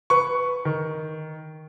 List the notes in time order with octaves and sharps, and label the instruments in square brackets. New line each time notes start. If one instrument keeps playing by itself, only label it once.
[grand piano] B4 C#6
D#3